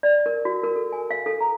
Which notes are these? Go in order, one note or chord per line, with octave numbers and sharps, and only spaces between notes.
D5
A#4
F#4
A#4
A4
G#5
F5
A4
A#5